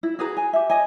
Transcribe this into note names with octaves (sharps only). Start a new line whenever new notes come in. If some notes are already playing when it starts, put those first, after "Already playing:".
E4
F#4 G#4 B4 A#5
G#5
G4 E5
D#5 G#5